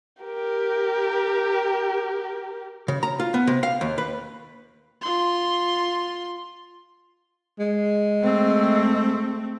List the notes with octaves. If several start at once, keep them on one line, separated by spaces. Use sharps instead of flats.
G4 A#4
C#3
A#5
F4
B3
C3
F5
D#2
B4
F4 C6
G#3
A3 C4